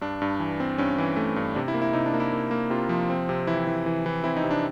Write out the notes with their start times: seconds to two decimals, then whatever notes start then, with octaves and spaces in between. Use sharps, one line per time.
0.01 G2 D4
0.22 G2
0.40 E3
0.60 C4
0.78 G2 C#4
0.98 E3
1.16 A3
1.36 G2
1.55 C3 D4
1.68 E4
1.74 A#3
1.82 E4
1.93 C3 D#4
2.06 D4
2.14 A#3
2.20 E4
2.32 A#3
2.51 A#3
2.70 C3 F4
2.89 F3
3.10 C4
3.29 C3
3.47 E3 E4
3.67 E3
3.86 E3
4.06 E3
4.24 C4 E4
4.37 D#4
4.44 C3
4.51 D4